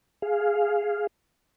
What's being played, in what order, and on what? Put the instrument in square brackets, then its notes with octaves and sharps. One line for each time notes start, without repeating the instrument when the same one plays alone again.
[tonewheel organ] G#4 F5